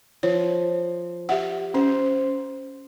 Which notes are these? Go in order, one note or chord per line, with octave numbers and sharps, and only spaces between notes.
F3 C#5
G4 D5 E5 F#5
C#4 C5